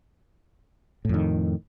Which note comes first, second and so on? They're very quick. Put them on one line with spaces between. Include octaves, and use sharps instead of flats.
A2 F2 D#3